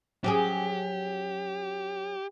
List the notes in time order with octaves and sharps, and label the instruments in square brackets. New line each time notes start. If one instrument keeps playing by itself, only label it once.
[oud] F#3 C#4 G#4 [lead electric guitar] G4